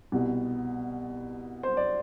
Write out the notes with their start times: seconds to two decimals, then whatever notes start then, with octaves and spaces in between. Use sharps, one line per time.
0.12 C2 B2
1.63 C5
1.77 D5